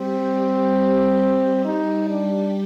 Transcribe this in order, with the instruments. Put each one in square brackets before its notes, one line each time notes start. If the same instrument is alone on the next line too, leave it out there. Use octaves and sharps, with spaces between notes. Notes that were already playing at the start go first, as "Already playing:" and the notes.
Already playing: [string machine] G3 G4 [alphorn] C4
[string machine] G3 G4
[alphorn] D#4
D4